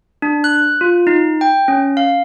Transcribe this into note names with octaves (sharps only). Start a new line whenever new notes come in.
D4
F#6
F4
D#4
G5
C#4
F5